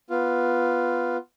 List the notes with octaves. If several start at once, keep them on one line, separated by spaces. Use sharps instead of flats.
B3 F4